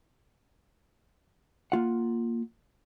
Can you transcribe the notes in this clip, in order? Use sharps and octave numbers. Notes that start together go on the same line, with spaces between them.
A#3 F4 F#5